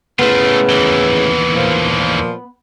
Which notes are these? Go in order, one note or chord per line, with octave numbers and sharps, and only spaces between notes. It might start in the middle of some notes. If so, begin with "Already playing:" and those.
A2 C#3 A3 B3 F4
D#2 E3
A#2 F3